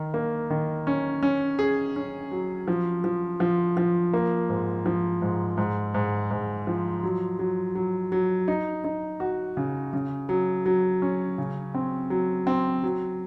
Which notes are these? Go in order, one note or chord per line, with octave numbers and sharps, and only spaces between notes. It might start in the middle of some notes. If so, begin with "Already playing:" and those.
Already playing: D#3
A#3
D#3
C#4
C#4
G#4
C#4
F#3
F3
F3
F3
F3
A#3
G#2
F3
G#2
G#2
G#2
G#2
F3
F#3
F#3
F#3
F#3
D#4
D#4
F#4
C#3
C#3
F#3
F#3
C#4
C#3
C4
F#3
C4
F#3